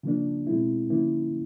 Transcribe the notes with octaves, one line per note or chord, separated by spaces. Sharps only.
C#3 F3 A#3 D4
B2 G#3 C4 E4
D3 F3 A#3 C#4 E4